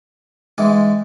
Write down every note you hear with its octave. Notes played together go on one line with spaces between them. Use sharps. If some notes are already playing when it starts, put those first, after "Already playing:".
G#2 E3 G#3 C4